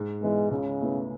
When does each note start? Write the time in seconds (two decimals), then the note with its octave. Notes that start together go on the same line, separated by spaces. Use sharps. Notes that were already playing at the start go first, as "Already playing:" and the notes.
Already playing: G#2
0.22 E3 G#3 B3
0.51 C#2 C#3
0.80 B2 A3 E4 B4